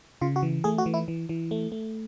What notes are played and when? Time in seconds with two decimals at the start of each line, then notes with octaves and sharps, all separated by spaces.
0.21 C#3 F4
0.36 F#4
0.43 E3
0.64 A3 G#4
0.78 F#4
0.86 E3
0.94 E4
1.08 E3
1.29 E3
1.51 A3
1.72 A3